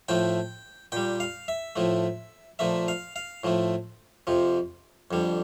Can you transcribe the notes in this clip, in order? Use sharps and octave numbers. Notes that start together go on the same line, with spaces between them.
A2 F3 A3 G5
A#2 G3 G5
F5
E5
A2 F3 A3
A#2 F3 A3 E5
F5
F5
A2 F3 A3
F2 C3 F3
F2 D3 G3